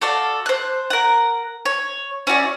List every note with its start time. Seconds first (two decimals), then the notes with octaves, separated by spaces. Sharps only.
0.02 F#4 A4 D5 F5
0.46 C5 F#6
0.90 A#4 F#5
1.65 C#5
2.27 C#4 E4 F#4 D5